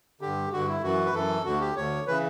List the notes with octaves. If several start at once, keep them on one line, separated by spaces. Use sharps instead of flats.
G2 D3 G4
G2 D3 F#4
E4
F#2 E3 F#4
B4
F#2 E3 A4
D2 D3 F#4
G4
D2 D3 C#5
C#3 E3 B4